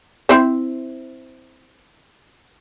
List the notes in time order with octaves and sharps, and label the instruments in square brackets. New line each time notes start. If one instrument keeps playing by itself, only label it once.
[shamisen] C4 E4 C5